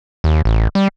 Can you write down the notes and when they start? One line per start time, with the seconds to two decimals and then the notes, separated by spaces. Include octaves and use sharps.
0.24 D#2
0.45 A1
0.75 G3